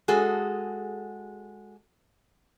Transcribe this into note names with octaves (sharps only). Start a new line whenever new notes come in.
G#3 F#4 G#4 A4